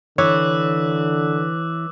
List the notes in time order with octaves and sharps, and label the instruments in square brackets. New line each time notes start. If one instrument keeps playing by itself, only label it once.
[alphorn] D3 [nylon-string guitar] E3 [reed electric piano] C#5 [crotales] D6 E6 F#6